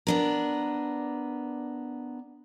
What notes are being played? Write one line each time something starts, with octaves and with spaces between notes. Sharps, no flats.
B3 D4 A#4